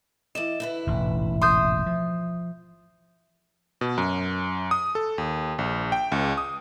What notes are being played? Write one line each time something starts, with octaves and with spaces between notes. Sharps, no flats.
E3 D5 D#5 E7
D3 E4 B4
E1 A1 G#2
E5 C6 D#6 G6
F3
B2
F#2
D#6
A4
D#2
A#1
G5
C#2
D#6